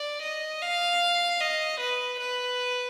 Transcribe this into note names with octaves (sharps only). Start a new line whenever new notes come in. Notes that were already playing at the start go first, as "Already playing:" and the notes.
Already playing: D5
D#5
F5
D#5
B4
B4